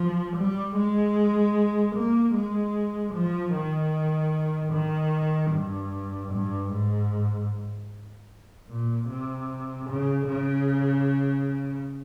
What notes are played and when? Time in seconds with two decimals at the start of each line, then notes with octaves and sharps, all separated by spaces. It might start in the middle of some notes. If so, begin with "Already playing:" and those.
Already playing: F3
0.36 G3
0.76 G#3
1.95 A#3
2.35 G#3
3.14 F3
3.54 D#3
4.72 D#3
5.52 G2
6.32 G2
6.71 G#2
8.69 A#2
9.10 C3
9.89 C#3
10.28 C#3